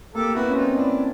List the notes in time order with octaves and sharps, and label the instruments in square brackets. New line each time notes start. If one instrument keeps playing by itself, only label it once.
[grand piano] A#3 [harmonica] G4 A4
[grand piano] B3 [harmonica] E4 F#4
[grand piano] C#4
[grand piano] C4 [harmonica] D#4 F4
[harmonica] D4 E4